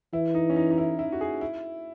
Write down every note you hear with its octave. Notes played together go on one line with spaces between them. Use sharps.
E3 E4
D#4
C#4
D#4
D#4
E4
E4
F#4
G#4
E4